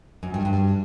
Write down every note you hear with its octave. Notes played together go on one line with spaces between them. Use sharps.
F#2
G2
G2